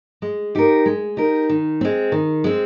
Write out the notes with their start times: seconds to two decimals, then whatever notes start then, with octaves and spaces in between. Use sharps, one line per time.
0.22 G#3
0.55 D#4 G4 A#4
0.86 G#3
1.17 D#4 G4 A#4
1.49 D#3
1.81 G#3 C4
2.12 D#3
2.44 G#3 C4